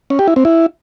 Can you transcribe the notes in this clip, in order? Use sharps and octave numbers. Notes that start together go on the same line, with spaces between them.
C#4
G4
E4
C4
E4